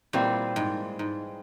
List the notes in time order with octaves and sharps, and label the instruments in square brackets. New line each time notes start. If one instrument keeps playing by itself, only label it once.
[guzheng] A#2 [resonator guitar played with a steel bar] E3 G3 C4 F4
[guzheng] G#2
G#2